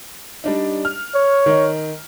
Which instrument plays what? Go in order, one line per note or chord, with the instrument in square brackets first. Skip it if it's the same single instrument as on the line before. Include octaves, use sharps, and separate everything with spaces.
[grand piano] G3 D4 D#4
F6
[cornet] C#5
[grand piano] D#3 D#4